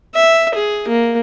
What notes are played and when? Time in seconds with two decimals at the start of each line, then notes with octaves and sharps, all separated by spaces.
0.15 E5
0.54 G#4
0.88 A#3